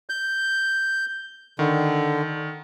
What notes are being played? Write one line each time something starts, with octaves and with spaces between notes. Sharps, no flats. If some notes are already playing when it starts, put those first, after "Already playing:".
G6
D3 D#3